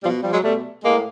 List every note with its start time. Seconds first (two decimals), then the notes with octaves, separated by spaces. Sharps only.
0.03 B2 F3 G3
0.23 F3 G3
0.33 F#3 G#3
0.43 B2 G3 A3
0.83 A2 G#3 A#3